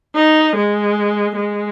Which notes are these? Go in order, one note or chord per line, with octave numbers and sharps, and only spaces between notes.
D#4
G#3
G#3